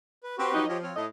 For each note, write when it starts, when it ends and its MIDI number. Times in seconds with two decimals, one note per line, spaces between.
0.23 0.36 71
0.38 0.51 60
0.38 0.65 66
0.38 0.65 67
0.38 0.65 71
0.54 0.68 53
0.54 0.68 54
0.54 0.68 63
0.68 0.90 53
0.68 0.77 67
0.68 0.77 73
0.68 0.77 75
0.83 0.95 60
0.83 0.95 73
0.83 0.95 89
0.96 1.05 45
0.96 1.06 69
0.96 1.05 75